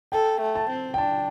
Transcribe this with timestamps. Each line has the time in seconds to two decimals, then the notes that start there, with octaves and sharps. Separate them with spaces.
0.12 A4 G5
0.41 A3
0.55 A5
0.70 C4
0.94 G5
0.98 D4 A5